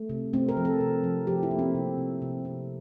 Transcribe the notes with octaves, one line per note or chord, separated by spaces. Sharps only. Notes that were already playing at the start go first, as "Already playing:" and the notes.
Already playing: A3
C3
A3 C4
A#4
F3
A4
C3
F3
F3 G4
E4
A#3
C4
C3
C3
C3
C3